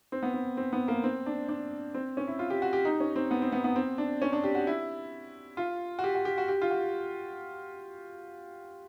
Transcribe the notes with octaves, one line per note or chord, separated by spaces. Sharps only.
C4
B3
C4
C4
B3
A#3
C4
D4
D4
C4
C#4
E4
F4
G4
F#4
G4
D#4
C#4
C4
B3
C4
B3
B3
C4
D4
C#4
D4
G4
F#4
E4
F4
F#4
G4
F#4
G4
F#4
G4
F4
F#4